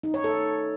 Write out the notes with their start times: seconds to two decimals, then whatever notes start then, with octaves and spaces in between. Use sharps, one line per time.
0.03 D#4
0.14 C#5
0.24 A4